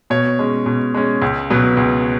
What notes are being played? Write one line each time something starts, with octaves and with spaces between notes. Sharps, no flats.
B2 C#5
G#3 C#4
B2
G#3 C#4
C#2
B2 F#3 B3
C#2